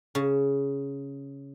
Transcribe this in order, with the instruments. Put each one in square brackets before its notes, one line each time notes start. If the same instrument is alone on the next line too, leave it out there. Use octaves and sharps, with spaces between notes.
[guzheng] C#3